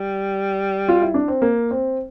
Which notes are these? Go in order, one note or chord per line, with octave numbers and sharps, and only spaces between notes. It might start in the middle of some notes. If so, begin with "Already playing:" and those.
Already playing: G3
F4
E4
D4
C4
A#3
C4